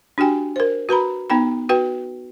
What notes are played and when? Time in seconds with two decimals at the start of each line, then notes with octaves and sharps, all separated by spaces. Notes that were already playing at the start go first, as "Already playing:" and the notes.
0.18 D4 F#4 G4 G5 G#5
0.56 A#4 C5
0.89 F#4 B4 A#5 B5
1.30 B3 D#4 G5 B5
1.69 F#4 B4 G5